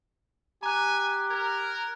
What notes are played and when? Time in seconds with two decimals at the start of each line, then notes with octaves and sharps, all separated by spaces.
0.63 G4 G#5 A#5 F#6
1.30 A#4 G#6